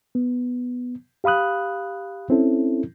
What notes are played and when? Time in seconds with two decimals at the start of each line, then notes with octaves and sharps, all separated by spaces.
0.15 B3
1.24 G4 F5 B5 D#6 F#6
2.30 C4 C#4 E4 A4